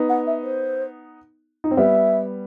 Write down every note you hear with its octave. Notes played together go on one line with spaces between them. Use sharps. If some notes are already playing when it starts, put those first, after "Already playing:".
Already playing: B3 D#4
F#5
E5
C5
D#4
C4
G3 B3 E5